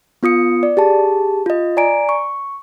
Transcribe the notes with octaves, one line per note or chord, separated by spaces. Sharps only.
B3 F4 D#6 C#7
D5
G4 G#4 A5
F4 D#5
D5 G#5 A#5 D7
C#6